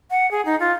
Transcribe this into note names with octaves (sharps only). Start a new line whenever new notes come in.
F#5
G#4
D#4
F4